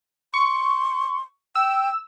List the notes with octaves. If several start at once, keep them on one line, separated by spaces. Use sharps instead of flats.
C6 C#6
G5 E6